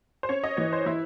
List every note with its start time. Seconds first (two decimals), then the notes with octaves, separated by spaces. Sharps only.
0.23 C5
0.29 C#4 C#5
0.44 D#5
0.57 E3 C#5
0.73 C5
0.86 E3 E4